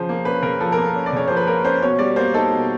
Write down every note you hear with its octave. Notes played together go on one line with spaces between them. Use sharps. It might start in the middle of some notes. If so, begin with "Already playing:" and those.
Already playing: C#3 F3 C5
A#3
C#4 B4
C#3 A#4
F3 A4
A#4
A#3
A4
C#4
D5
C#3 C#5
F3 C5
B4
A#3 A#4
C#4 C5
B2 C#5
G3 D5
A#3 C5
D#4 A4
B2